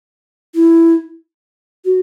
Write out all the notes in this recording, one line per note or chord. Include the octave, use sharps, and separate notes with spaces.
E4
F#4